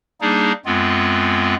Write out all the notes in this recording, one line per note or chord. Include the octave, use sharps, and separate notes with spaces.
G3 A#3 D4 D#4 G#4
F#2 G#3 B3 C4 F4